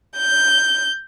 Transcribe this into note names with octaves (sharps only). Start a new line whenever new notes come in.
G6